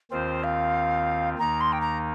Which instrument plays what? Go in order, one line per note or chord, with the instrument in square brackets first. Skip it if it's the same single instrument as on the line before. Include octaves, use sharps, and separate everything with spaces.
[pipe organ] D#2 D#3 C4 F4 [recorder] C5
[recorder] F5
[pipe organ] D#2 D#3 A#3 D#4 [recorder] A#5
[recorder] C6
G5
A#5